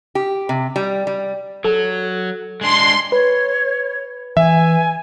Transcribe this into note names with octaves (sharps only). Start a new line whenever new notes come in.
G4
C3
G3
G3
F#3 A4
G#3 D4 C6
B4 C#5
E3 E5 G#5